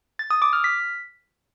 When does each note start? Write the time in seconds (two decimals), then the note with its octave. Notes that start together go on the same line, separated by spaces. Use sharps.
0.19 A6
0.31 D#6
0.42 D6
0.53 F6
0.64 B6